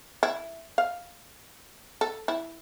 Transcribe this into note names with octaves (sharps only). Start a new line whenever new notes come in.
E4
F5
A4
E4